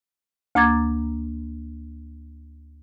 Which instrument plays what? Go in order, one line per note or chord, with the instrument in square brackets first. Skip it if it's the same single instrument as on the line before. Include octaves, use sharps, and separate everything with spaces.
[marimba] D2 A#3 A#5 D6 G#6 A6